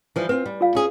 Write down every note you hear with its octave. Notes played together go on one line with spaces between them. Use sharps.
E3 F3 G3
C4 F4 B4
G3
F4 F5
C#4 G#4